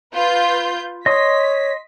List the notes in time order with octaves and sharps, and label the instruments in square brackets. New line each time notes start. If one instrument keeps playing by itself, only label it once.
[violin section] F4 B4 G6
[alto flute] C#5 [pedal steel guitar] D#5 C6 D#6 [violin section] B6